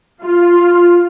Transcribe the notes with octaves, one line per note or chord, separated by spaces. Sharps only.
F4